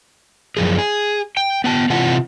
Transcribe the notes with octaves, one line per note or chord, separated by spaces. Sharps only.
F#2 F3 G#4
G#4
G5
B3 G5 A5
C3 E3 F4 F#5 A5